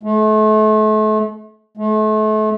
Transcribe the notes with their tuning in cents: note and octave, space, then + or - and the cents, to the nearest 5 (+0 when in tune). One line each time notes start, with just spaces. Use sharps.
A3 -35
A3 -35